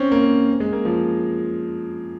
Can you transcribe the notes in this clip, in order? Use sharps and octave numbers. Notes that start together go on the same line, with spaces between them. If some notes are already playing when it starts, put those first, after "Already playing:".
Already playing: C4 C#4
A#3
G#3
A#3
F3